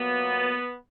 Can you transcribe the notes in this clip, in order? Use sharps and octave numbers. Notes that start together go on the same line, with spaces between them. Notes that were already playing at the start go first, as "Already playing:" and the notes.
Already playing: A#2 F#3 A#3 B3